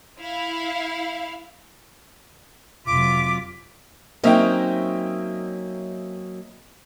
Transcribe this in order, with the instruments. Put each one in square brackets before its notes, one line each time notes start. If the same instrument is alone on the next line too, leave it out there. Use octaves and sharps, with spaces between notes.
[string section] E4 F5
[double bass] F1 C3 [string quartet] F#3 F4 [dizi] D6 [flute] B6
[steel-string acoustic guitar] F#3 A#3 C#4 [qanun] C4 D#4 [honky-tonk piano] D#5 E5 G5